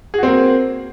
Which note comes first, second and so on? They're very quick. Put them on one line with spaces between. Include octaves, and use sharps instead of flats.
G#4 F#4 C4 A#3